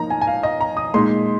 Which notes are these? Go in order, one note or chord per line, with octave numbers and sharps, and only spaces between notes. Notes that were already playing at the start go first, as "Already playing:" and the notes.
Already playing: F3 A#3 D#4 A#5
G#5
G#5
F5
D#5
A#5
D#6
A#2 G#3 D#4 C6